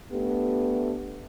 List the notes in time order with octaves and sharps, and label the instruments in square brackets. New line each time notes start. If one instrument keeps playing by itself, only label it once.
[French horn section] A3 B3 D4 G4